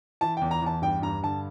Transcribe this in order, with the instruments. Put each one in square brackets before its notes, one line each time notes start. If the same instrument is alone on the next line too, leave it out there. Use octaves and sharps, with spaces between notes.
[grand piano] E3 A5
E2 G5
A#5
E2 A5
G2 G5
G2 A#5
D3 A5